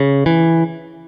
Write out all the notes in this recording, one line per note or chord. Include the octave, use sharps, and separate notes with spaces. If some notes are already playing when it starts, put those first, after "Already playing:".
Already playing: C#3
E3